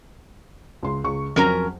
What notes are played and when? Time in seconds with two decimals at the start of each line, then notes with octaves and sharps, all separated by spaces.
0.83 C#2 C6
1.04 C#2 C#6
1.36 F2 F#3 C#4 A#4 A#5